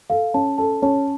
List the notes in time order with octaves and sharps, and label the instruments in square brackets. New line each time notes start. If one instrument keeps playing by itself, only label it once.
[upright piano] A4 [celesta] F5
[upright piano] C#4 [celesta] A5
[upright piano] A4 [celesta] A5
[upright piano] C#4 [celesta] A5